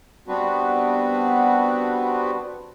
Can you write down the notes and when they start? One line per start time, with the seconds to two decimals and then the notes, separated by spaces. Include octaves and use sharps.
0.28 G3 B3 C4 D4 F#4 B4